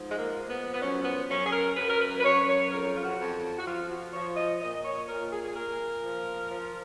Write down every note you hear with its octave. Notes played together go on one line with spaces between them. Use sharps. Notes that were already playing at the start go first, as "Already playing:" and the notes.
Already playing: G#2 F3
G#3
A#3
F3
B3
B3
F#2 C#4
B3
F#2 C#4
G#4
A#4
F#2 B4
A#4
B4
B4
F#2 C#5
C#5
F2 A#4
F4
F#4
F2
F#4
F3 F4
F#4
F3 C#5
D#5
A#2 D#5
C#5
A#2 A#4
G#4
G#4
A#2 A#4
F3
F3